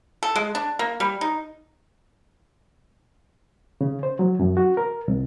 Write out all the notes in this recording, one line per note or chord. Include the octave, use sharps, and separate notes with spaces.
A4
G#3
D4
A#3
G3
D#4
C#3
C5
F#3
F#2
F#4
A#4
C2